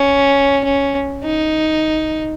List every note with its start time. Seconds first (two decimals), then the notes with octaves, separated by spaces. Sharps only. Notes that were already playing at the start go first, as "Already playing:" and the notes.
Already playing: C#4
0.64 C#4
1.24 D#4